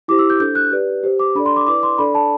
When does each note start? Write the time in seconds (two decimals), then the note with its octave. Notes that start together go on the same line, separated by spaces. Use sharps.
0.08 E4 G4 C5 D6
0.19 E6
0.30 G6
0.40 D4 A4 C5 G6
0.55 F#6
0.72 G4 B4 D5
1.03 G4 C5
1.19 D6
1.35 D4 A4 D5 B5
1.46 C6
1.56 D6
1.67 E4 B4 D5 D6
1.83 C6
1.98 D4 A4 D5 B5
2.15 A5